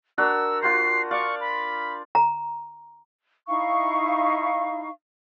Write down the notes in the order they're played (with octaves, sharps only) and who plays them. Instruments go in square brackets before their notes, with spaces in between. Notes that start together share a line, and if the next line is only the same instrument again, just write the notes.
[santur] D4 F#4 A#4 [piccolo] E6
[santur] F4 F#4 C5 [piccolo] C7
[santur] D5 F5 [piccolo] C#6
[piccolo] B5
[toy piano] A#5
[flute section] D#4 E4 F5 C#6